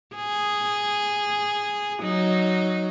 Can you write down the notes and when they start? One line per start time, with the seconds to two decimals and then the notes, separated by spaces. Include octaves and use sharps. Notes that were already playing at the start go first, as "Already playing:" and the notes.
0.16 G#4
2.02 F#3 D#4